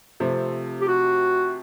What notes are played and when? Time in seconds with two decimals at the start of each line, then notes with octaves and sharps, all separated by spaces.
0.20 C3 F3 A3 C4
0.81 G4
0.88 F#4